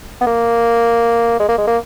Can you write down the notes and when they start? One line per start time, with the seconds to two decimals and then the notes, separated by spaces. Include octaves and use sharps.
0.21 B3
0.27 A#3
1.40 G#3
1.48 A#3
1.58 G#3
1.67 A#3